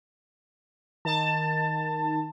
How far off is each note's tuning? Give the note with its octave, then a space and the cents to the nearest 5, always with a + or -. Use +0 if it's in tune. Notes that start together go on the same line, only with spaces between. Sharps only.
D#3 +0 A5 +20